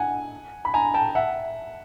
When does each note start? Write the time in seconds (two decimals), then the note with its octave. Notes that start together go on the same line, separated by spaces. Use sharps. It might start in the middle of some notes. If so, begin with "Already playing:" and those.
Already playing: F#5 G#5
0.65 B5
0.74 G#5 A#5
0.94 G5 A5
1.15 E5 F#5